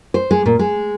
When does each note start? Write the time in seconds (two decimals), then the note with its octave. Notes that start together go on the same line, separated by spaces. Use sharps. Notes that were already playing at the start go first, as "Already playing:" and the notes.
0.14 C5
0.31 G#3
0.46 A#2
0.59 G#3